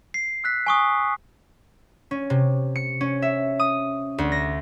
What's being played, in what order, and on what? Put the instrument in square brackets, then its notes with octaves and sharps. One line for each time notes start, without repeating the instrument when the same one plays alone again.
[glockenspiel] C7
E6 F#6 B6
G#5 C#6 D#6
[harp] C#4
C3
C#7
C#4
E5
D#6
D2
A#6